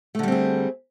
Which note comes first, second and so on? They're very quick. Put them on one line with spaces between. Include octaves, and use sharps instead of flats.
A3 D3 G3 C4 G#4